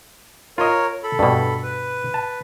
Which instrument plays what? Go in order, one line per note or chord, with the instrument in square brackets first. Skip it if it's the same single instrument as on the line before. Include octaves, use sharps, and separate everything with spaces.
[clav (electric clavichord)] F4 D#5 [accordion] A#4 C#5
[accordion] A4 B5
[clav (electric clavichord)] G2 B2
[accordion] B4
[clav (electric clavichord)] A5